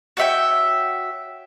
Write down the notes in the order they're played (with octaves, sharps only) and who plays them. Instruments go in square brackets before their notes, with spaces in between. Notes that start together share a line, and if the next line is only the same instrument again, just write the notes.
[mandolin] F#4 C#5 E5 G5